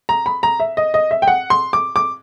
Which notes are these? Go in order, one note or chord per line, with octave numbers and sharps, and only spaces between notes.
A#5
B5
A#5
E5
D#5
D#5
E5
G5
F#5
C6
D6
D6